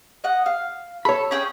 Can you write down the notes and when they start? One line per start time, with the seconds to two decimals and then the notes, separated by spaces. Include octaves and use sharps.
0.24 D#5 F#5
0.46 F5
1.05 A4 C#5 B5
1.31 C#4 G#4 G5